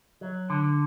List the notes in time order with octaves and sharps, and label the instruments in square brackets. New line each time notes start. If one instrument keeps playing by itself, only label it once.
[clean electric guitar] F#3
D3